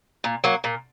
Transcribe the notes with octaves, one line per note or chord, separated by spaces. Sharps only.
A#2
F#3 A#3
A#2